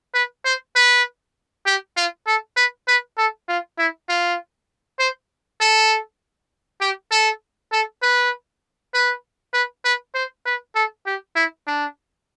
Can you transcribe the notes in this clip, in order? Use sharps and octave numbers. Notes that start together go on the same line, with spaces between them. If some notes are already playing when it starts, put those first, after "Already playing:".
B4
C5
B4
G4
F4
A4
B4
B4
A4
F4
E4
F4
C5
A4
G4
A4
A4
B4
B4
B4
B4
C5
B4
A4
G4
E4
D4